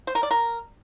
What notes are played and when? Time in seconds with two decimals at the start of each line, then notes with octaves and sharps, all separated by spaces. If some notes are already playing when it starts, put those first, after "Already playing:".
0.07 C5
0.15 A#4
0.23 D5
0.31 A#4